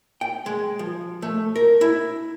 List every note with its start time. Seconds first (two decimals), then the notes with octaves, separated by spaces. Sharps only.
0.21 G5
0.46 G#3
0.79 F3
1.22 A3
1.56 A#4
1.81 E4